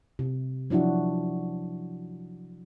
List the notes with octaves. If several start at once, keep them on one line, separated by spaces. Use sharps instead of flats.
C3
F3 F#3 D4 E4 F#4